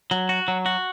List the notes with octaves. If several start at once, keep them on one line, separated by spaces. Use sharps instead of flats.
F#3
F#4
F#3
F#4